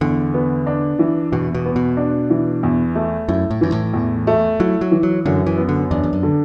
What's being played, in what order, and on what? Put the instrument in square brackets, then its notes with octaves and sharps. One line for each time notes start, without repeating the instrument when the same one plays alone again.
[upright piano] E2 [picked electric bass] D3
[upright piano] B3
D4
E3
[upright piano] E2 [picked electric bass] B2
[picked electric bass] B2
[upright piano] B3
[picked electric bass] B2
[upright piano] D4
E3
E2
A3
[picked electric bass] F#2 [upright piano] E4
[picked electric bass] A2
[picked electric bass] F#2 [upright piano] E3
[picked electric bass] A2
[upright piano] E2
A3
[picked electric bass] F#3 [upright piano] E4
[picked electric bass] F#3
[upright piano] E3
[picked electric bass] F#3
[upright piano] F#2 [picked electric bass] D3
[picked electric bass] E3
[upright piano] B3
[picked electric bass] D3
[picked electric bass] E2 [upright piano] D4
[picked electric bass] E2
F#2
[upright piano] D3